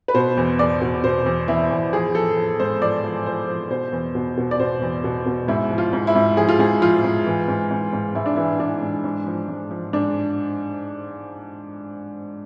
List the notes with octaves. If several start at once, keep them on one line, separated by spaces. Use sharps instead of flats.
B4
B2 C5
E2
E2 D5
B2
B2 C5
E2
E2 E4
E2
F3 G#4
F3 A4
F3
G#2 C5
F3 D5
F3
F3 C5
F3
B2 C5
E2
B2
B2
D5
B2 C5
E2
B2
B2
G#2 E4
F3
F4
G#2
E4
G#2
F3 G#4
F4
G#2 G#4
F3 F4
G#2
E3
G#2
G#2
G#2
G#2 E4
D4
E3 E4
E3 D4
G#2
G#2
F3
G#2
F3
G#2 D4